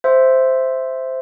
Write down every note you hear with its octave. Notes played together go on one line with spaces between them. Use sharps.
C5 E5